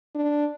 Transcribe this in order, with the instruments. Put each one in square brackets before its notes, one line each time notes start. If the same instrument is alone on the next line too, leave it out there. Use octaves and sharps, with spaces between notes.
[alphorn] D4